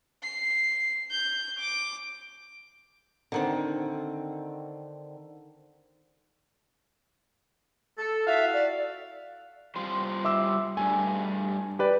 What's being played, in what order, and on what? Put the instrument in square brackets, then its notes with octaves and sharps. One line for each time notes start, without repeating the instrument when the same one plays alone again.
[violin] C7
G6
D6
[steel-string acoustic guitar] D3 D#3 C4
[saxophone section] A4
[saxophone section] E4 F#4 F5 [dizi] E5
[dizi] D5
[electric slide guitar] G3 F4 C5
[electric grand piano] E5 D6 E6
[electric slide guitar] G2 G3 A3 [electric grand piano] G#5
[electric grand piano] G4 B4 D5